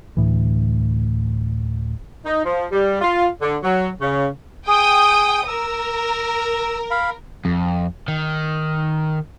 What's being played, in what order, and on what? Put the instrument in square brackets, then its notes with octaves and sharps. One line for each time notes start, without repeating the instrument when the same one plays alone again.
[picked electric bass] D2 A2 E3
[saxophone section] D#4
F3
G3
F4
D3
F#3
C#3
[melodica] G#4 [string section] G5 D#6
[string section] A#4 [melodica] E6
[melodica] F5 B5
[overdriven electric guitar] F2
D#3